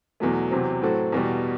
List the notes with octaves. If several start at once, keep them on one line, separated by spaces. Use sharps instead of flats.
E2 B2 F#3 A3
E2 C3 F#3 C4
A2 F#3 C4 F#4 A4
E2 B2 G3